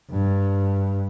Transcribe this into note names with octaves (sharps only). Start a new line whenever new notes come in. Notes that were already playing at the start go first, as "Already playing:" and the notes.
G2